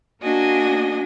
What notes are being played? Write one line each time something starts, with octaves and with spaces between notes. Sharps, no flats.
A#3 D4 F#4 D#5 G#5